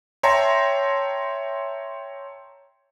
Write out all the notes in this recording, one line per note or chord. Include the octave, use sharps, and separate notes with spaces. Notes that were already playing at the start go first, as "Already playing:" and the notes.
C#5 E5 G5 A5 A#5 C6